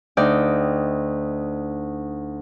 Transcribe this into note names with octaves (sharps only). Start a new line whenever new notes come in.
D2 D#4 D5 G5